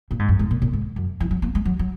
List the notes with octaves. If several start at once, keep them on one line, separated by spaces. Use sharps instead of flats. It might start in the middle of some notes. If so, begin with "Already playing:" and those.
A#2
G#2
F#2
G#2
A#2
A#2
G#2
F#2
E3
F#3
A#3
G#3
F#3
F#3